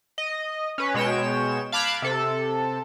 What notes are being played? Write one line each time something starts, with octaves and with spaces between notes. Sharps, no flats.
D#5
C#4 B4
B2 G#3 C#5 G5 E7
F5 A5 B5 D6 F#6 G#6
C3 A4